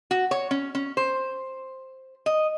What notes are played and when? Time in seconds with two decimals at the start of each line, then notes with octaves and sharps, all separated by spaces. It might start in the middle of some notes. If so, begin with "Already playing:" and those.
0.11 F#4
0.31 C#5
0.51 C#4
0.75 C#4
0.97 C5
2.26 D#5